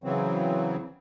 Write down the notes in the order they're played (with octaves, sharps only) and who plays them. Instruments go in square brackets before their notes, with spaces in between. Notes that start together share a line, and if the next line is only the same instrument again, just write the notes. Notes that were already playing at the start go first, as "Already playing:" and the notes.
[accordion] C#3 E3 F#3 C4